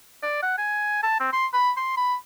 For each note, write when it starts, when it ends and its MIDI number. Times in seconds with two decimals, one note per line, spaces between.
0.23 0.39 74
0.43 0.57 78
0.58 1.01 80
1.03 1.19 81
1.20 1.30 60
1.33 1.46 84
1.54 1.71 83
1.77 1.94 84
1.97 2.15 83